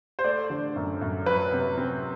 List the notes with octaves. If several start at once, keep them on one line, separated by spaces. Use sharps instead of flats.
C5
A3 D5
D3
F#2
F#2
F#3 B4
C3
C4